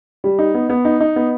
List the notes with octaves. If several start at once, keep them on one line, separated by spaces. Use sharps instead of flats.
G3
D#4
B3
B3
D#4
D#4
B3